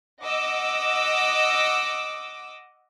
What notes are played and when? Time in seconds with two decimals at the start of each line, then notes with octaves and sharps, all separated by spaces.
0.22 D#5 F#5 D6 E6